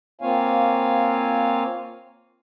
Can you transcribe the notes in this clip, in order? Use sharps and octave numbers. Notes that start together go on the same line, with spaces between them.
A#3 C4 F4 C#5 F5 G#5